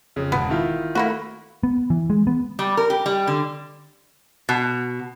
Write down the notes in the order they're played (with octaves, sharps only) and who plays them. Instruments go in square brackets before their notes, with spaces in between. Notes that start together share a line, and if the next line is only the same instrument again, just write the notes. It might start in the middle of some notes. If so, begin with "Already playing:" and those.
[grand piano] F2 C#3
[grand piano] E1 [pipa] B3
[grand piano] D#3 E4 F4
[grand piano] A3 [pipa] A#3 E4 F#4
[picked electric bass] B3
E3
G#3
B3
[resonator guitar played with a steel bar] G3
A#4
G4
G3
D3
B2